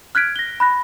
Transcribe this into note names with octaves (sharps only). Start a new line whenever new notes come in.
F6 F#6 G#6 B6 D7
A#6 G7
B5 F#6 A#6